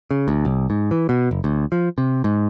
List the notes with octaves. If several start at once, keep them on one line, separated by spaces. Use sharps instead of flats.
C#3
D2
C2
G#2
E3
B2
F#1
D2
F3
C3
G#2